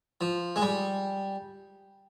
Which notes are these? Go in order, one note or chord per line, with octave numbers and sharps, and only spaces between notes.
F3
G#3
G3